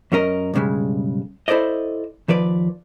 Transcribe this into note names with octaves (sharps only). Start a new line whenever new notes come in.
F#2 F#3 C#4 A#4 D#5
B1 G2 C#3 G3 G#3
E4 A4 C5 D5 D#5
D#2 F3 B4 D5